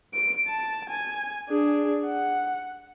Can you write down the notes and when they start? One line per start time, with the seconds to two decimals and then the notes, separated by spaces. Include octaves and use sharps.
0.14 D7
0.47 A5
0.90 G#5
1.49 D4 G#4
2.06 F#5